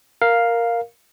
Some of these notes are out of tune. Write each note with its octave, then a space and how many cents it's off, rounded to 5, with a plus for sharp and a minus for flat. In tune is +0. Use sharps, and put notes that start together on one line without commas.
A#4 +0 F5 +0